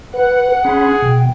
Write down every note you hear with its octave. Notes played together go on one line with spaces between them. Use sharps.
B4 F#5
C#4 G#4 B5 C6
B2 G5